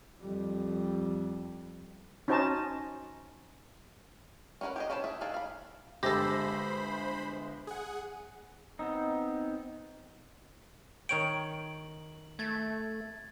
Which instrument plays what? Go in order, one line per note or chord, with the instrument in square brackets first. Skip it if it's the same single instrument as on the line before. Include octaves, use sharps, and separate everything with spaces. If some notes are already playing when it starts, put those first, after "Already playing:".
[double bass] F2 G3
[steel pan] C#4 D#4 F#4 C5 D#5 A5
[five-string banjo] C#4 E4 A#4 B4 F#5
G4 G#4 D#5
C#4 G4 B4 C5 A5
G#4 E5
D4 D#4 G#4 A4 F5
F5 B5
[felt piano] G1 G#3 A#6 [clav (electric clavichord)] G4 A4 [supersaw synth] C5 B5
[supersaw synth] G#4 F#5
[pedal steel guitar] B3 C4 D#4
[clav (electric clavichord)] D#3 C#5 G5 [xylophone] D7 [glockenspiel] F#7
[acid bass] A3 [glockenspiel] G#6 A6